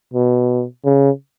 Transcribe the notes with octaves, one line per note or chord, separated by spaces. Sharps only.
B2
C#3